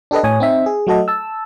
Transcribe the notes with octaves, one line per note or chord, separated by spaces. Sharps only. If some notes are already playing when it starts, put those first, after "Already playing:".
D4 G4 A4 B4 D#5
A2 C#5 G#5 D#6
C4 D#4 E5
G#4
F#3 A3 F#4 A4 D#5
A5 E6